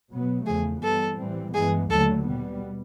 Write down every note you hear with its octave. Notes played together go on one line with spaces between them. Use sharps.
B2 F#3 B3
E2 C#3 F3 A3 G#4
G2 E3 G3 B3 A4
A2 E3 G3 C4
G2 E3 G#3 B3 G#4
D#2 D3 F#3 A3 A4
B2 G3 B3